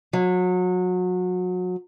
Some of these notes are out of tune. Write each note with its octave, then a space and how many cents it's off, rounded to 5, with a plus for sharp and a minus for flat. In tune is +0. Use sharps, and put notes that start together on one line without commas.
F#3 -30